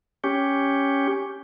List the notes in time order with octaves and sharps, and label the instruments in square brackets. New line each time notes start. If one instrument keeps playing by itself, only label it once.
[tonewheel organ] C#4 G4